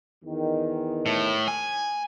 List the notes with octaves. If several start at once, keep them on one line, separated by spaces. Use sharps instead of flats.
E2 D#3
A2
G#5